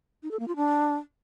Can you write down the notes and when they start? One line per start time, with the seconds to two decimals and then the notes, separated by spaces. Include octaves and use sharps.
0.23 D#4
0.31 A4
0.40 A#3
0.48 F4
0.56 D4